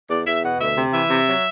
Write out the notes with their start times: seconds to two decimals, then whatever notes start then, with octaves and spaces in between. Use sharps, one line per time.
0.09 E2 D5
0.26 E2 E5
0.43 B2 F#5
0.60 D2 E5
0.77 C3
0.93 E3 E5
1.10 C3
1.26 F#3